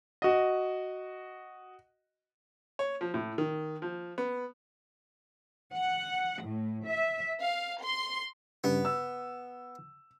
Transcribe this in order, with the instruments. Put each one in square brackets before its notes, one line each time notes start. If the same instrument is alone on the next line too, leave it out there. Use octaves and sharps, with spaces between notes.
[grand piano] F#4 D#5
[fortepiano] C#5
F3
A2
D#3
F3
B3
[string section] F#5
A2
E5
F5
C6
[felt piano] G2 C#3 [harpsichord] B3
[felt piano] E6